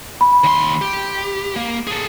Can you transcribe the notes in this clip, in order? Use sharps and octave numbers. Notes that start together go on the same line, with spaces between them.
B5
D#2 C6
G4
A#3
G#4 A4